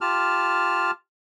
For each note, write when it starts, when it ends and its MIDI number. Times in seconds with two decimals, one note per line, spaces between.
0.01 0.91 65
0.01 0.91 67
0.01 0.91 81
0.01 0.91 89